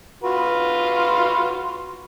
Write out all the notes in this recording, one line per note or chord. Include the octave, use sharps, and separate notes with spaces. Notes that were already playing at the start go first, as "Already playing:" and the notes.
F4 F#4 B4